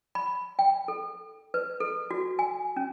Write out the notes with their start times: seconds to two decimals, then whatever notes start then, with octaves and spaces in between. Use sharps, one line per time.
0.15 B5
0.59 G5
0.88 A4
1.54 B4
1.80 A4
2.11 F#4
2.39 G#5
2.76 C#4